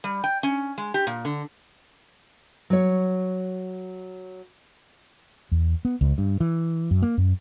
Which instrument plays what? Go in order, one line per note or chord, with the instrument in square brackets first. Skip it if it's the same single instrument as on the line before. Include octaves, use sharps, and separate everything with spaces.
[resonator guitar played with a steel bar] G3
G5
C#4
G#3
G4
A#2
D3
[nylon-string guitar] F#3 C#5
[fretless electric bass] E2
B3
C#2
G2
E3
F#2
A#3
F#2